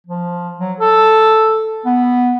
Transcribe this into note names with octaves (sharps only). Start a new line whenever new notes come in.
F3
F#3
A4
B3